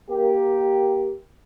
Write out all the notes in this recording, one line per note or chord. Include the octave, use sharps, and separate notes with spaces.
A#3 G4